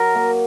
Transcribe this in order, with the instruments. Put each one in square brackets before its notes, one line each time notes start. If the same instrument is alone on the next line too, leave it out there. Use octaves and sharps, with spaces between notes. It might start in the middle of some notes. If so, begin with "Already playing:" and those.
Already playing: [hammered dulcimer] F#3 [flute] A#4
[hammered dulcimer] A#3